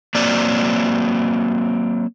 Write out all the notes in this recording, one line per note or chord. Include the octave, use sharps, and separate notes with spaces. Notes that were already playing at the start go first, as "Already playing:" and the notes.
F#3 A#3 C4 D5